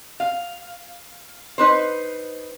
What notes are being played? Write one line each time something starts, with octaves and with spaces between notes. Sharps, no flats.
F5
D#4 B4 C5